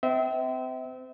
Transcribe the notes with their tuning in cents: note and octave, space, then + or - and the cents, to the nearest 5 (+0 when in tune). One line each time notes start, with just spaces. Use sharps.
C4 -30 E5 -30